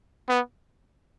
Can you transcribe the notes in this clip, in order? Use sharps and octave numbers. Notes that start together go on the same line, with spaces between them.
B3